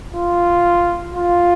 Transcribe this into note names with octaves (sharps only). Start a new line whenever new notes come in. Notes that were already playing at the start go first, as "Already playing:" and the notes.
F4
F4